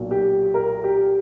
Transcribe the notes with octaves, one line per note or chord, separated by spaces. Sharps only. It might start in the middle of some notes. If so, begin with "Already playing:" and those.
Already playing: B1 A#2 F#3
G4
A#4
G4